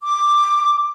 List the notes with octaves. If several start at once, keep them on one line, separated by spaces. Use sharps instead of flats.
D6